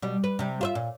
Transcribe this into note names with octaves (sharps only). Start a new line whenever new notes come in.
B2 G3
B4
C3 G3
F4 C5 E5
A#2